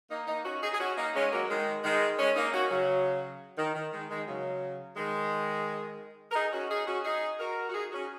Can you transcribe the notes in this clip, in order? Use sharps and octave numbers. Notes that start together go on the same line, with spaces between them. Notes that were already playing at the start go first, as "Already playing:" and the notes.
A#3 D#4
A#3 D#4
C#4 F#4
D#4 G#4
G#4
C#4 F#4
A#3 D#4
G#3 C#4
F#3 A#3
D#3 G#3
D#3 G#3
G#3 C#4
A#3 D#4
C#4 F#4
C#3 F#3
D#3
D#3
D#3 G#3
D#3 G#3
C#3 F#3
D#3 G#3
A#4
D#4 G#4
C#4 F#4
D#4 G#4
C#4 F#4
D#4 G#4
F#4 A#4
F#4
D#4 G#4
C#4 F#4